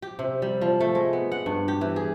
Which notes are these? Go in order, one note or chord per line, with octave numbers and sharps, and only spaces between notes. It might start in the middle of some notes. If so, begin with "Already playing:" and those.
G4
C3
G3
F3
A3
G#3
B3
F#5
G2
G4
E3
G#4